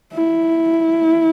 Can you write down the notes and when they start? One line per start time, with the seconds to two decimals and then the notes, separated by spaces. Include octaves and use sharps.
0.12 E4